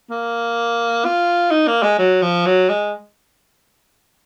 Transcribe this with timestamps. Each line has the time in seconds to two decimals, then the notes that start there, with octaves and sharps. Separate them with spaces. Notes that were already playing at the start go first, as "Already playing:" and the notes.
0.10 A#3
1.05 F4
1.51 D#4
1.67 A#3
1.83 G#3
1.99 F#3
2.22 F3
2.46 F#3
2.69 G#3